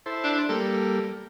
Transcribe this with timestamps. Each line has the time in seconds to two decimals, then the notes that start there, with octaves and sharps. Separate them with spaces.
0.06 E4 A4 C5
0.24 D4
0.49 G3 A#3 A4